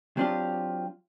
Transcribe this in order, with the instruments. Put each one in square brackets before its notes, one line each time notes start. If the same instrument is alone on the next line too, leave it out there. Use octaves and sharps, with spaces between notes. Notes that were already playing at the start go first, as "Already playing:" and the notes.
[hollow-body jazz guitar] F#3 C4 D4 F4 G4